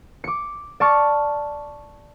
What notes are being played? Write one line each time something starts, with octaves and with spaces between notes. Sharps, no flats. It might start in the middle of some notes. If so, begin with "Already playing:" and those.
D6 C#7
D5 A5 C#6 F6 A6 C#7